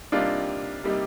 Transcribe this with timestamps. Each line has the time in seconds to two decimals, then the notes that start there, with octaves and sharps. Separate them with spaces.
0.12 C3 G3 A#3 D4 D#4 F4 G4
0.84 C3 G3 A#3 D#4 G4